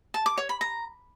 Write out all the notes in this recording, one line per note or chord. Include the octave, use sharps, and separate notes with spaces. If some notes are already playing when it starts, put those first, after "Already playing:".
A5
D6
C#5
B5
A#5